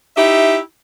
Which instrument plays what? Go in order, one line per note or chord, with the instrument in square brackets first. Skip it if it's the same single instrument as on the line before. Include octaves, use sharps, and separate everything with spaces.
[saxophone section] D#4 E4 G4 E5